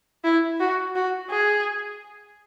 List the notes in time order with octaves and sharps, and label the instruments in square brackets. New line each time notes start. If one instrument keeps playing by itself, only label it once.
[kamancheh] E4
F#4
F#4
G#4